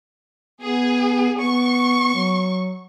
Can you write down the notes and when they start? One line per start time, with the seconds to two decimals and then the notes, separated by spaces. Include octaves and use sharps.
0.61 B3 G#4
1.39 B3 C#6
2.15 F#3